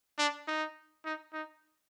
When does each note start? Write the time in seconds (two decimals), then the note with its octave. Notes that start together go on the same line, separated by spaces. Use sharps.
0.18 D4
0.47 D#4
1.05 D#4
1.33 D#4